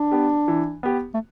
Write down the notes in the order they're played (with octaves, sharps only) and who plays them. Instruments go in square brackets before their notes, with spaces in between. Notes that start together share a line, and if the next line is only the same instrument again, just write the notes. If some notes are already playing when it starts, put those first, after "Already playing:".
Already playing: [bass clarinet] D4
[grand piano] B3 G4
E3
B3 G4
[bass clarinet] A3